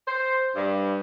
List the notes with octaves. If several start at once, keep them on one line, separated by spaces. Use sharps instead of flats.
C5
G2